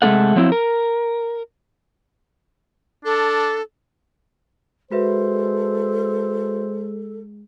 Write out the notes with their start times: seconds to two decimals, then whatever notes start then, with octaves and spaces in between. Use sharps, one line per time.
0.02 C3 G#3 A3 C4 A4 F#5
0.36 F3 F#3 C4 D#4 E4
0.52 A#4
3.05 D4 A4
4.91 G#3 F#4 A4 B4 C5 E5